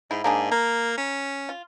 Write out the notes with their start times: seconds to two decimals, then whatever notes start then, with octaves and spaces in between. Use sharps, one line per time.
0.11 G#2 E4
0.24 G#2 A#3 D4 G#4
0.52 A#3 A#4
0.98 C#4
1.49 F4